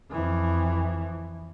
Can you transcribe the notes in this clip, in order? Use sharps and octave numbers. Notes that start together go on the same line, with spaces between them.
F2 E3